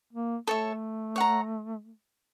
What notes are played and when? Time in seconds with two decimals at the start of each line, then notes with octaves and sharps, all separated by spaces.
0.13 A#3
0.47 A3 A4 C#5 E5
1.16 C#5 F#5 A#5